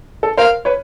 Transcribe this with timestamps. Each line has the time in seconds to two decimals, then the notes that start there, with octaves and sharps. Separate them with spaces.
0.23 A4
0.37 A#4 C5 F5
0.65 B4 C#5